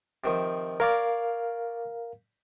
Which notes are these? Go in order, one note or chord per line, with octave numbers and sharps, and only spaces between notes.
C3 D#3 F3
A#4 C#5 D5 F5